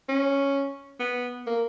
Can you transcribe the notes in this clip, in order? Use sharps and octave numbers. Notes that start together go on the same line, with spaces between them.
C#4
B3
A#3